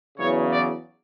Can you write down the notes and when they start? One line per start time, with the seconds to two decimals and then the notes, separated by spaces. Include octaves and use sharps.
0.17 E2 C#3 F#3 C#5
0.51 D5